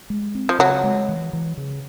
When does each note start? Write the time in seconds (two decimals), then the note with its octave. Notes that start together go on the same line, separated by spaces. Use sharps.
0.10 G#3
0.35 C4
0.49 F3
0.59 C#3 F#3
0.84 G#3
1.09 E3
1.33 E3
1.57 C#3